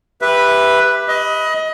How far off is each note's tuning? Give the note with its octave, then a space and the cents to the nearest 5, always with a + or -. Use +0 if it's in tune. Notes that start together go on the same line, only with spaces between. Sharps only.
G4 +15 B4 +0 E5 +0
D#5 +25 B5 -5